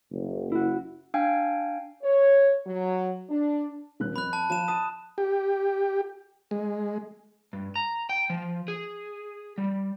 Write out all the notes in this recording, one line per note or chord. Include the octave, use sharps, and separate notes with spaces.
F#1
E4 F#4
D4 F5 G5 G#5
C#5
F#3
D4
D#1 F#6
F2 B5 F#6
A5
F3 A5 E7
A5 D#6 D#7
G4
G#3
G2
A#5
G5
F3
G#4
G3